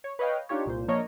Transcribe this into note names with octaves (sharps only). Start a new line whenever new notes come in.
C#5
B4 C#5 D#5 F5 G5
D4 D#4 F4 G4 C#5
C2 A#2 C5
F3 A#3 D4 A#4 C#5 D#5